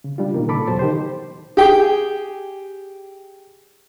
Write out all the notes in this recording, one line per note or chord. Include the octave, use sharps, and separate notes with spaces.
C#3
G3 D4 F4
B2 D#3 A#3
A#2 C#3 A4 B5 D6
E2 B2 F#3 C5 A5
D#3 G4 C5
G4 G#4 G5